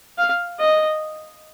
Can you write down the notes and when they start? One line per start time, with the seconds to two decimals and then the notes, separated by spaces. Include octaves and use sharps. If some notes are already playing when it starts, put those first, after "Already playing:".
0.18 F5
0.60 D#5